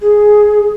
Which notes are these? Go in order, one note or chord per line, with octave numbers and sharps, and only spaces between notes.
G#4